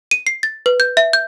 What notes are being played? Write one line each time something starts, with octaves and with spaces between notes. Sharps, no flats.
D#7
C7
A6
B4
G6
E5
G6